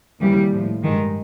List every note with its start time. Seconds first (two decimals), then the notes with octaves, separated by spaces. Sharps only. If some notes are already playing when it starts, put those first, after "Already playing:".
0.21 D#2 C#3 E3 G3
0.52 A2 F3
0.83 G2 D#3 G#3